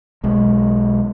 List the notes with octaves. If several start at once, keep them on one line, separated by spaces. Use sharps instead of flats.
B1 G#3